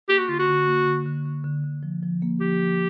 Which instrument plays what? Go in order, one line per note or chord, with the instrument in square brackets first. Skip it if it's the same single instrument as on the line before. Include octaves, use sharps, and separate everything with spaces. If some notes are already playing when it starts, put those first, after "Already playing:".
[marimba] A#3 [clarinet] G4
[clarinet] F#4
[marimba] D3 [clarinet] F4
[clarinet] F#4
[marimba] D3
A#3
D3
D3
D3
D3
D3
F3
F3
A#3
[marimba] F3 [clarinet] G4
[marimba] F3